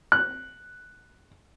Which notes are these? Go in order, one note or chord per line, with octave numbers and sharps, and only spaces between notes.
F#6